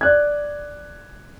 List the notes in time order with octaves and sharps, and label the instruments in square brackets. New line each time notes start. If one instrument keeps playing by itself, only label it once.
[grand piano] D5 F#6 G#6